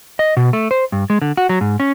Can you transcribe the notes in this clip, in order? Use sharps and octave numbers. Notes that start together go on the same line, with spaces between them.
D#5
B2
A3
C5
G2
G#3
D3
F#4
F#3
G#2
C#4